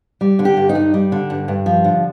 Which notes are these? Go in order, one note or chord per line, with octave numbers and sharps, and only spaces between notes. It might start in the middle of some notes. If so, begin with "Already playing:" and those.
G3
D3
G4
G2
D#4
G2
G3
D3
G2
G2
F3
D3